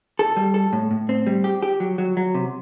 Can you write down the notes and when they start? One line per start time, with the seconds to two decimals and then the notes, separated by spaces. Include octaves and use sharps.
0.19 A4
0.37 G3
0.54 A4
0.73 A2
0.91 A2
1.09 C4
1.27 G3
1.44 G4
1.63 G4
1.80 F#3
1.98 F#3
2.17 F#3
2.34 C3